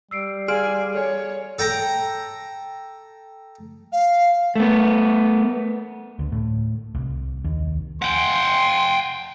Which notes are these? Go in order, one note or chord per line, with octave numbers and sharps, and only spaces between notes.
G3 E6 C7 D7
G#4 D5 F5 G#5 C6 F6 D7
A4 C#5 D5 G#5
A4 G5 A#5
F5
A3 B3
D2
A2
C2
D#2
F#5 G5 C6